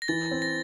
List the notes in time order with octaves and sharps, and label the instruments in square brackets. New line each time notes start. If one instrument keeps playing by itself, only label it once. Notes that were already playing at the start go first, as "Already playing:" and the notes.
[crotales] A#6
[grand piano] E3 [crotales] A6
[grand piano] C4
[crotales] A#6